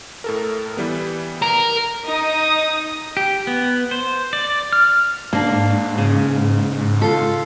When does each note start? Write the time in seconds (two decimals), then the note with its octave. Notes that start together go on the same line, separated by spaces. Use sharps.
0.24 A2 A4 A#4
0.77 E3 G3 B3
1.42 A#4
2.07 D#4 D#6
3.17 G4
3.47 B3
3.91 C5
4.33 D5
4.73 F6
5.33 G#2 A#3 D4
5.98 C#3
7.02 F4 A4